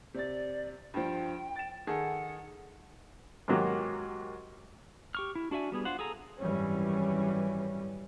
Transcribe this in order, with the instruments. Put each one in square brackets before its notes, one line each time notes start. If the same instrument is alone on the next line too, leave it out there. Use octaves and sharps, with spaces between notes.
[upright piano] C3 A6 [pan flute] D5
[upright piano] G2 F3 [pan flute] G5
[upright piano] A6 E7
[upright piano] D#3 G#4 A4 [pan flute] F#5
[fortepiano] G#2 D#3 F#3 A#3 F#4 G4
[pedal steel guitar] G4 C#6 F6
E4
D4 F#4 D5 E5 G#5
G3 B3 G#4
D4 F4 C5 F#5
G#4 A4 G#5 A#5
[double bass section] G#1 F#2 E3 G3 C#4